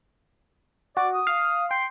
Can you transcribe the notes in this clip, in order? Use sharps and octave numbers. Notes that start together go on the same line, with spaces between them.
F#4 D5
D#6
F5
G5 C6